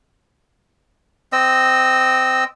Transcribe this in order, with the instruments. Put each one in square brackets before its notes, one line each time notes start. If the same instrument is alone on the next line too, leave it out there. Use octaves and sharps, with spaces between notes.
[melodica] C4 D#5 E6